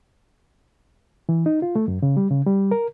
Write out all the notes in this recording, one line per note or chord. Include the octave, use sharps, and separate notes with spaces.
E3
D#4
F4
A3
F#2
C#3
G3
C#3
G3
A#4